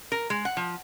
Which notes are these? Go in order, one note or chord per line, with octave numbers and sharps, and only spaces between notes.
A#4
G#3
F#5
F3